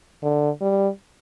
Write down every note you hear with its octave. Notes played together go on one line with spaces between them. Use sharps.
D3
G3